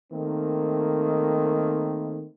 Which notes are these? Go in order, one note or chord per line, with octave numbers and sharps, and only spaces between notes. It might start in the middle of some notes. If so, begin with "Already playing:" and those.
D#3 A3 A#3 C4